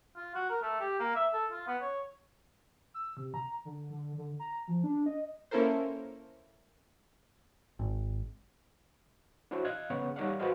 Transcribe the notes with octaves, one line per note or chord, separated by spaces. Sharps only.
F4
F#4
A#4
A3
G4
A#3
E5
A4
F4
B3
C#5
E6
C3
A#5
D3
D3
D3
A#5
F3
D4
D#5
A#3 C#4 E4 A4 A#4 C5
G#1
D4 E4 F#4 C5 C#5
D#5 F5 F#6 G#6
C#3 B3 C#5 F#5
G3 D#4 C#5 D5 F5 F#5
F#4 G#4 B4 C5 D#5 F5